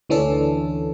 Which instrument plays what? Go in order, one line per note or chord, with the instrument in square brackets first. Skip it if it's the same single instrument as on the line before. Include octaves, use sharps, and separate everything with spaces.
[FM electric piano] D2 E3 C#4 D4 A4